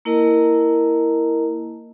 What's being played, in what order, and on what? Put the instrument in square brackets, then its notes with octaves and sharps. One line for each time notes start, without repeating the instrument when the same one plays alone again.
[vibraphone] A#3 E4 A#4 D#5 A5 A#5